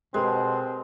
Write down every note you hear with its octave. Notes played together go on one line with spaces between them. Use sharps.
B2 G#3 C4 G4 A#4 B4